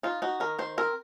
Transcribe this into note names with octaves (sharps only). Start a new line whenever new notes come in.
D#4 F4
D#4 F#4
D#3 A#4
D#3 C5
C4 A#4